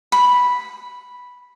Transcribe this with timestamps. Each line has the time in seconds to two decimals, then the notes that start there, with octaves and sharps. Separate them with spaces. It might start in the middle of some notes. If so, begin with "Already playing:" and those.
0.12 B5